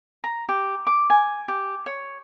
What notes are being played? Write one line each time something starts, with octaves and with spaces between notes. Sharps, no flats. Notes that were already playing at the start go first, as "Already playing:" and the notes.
A#5
G4
D6
G#5
G4
C#5